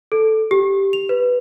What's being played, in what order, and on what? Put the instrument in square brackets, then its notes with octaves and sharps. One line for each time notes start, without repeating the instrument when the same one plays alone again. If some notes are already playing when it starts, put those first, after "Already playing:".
[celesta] A4
G4
F7
B4